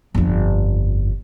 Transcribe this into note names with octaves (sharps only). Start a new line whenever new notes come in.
G1 F2